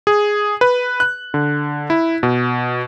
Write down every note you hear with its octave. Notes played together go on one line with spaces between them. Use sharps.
G#4
B4
F#6
D3
E4
B2